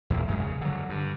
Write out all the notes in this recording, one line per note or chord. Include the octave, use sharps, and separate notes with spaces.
E2 A#2 A#3
F#2 G#3
C#3
D3 F#3
G2